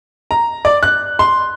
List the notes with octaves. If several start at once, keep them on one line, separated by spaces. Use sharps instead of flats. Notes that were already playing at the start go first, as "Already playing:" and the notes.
A#5
D5
F#6
C6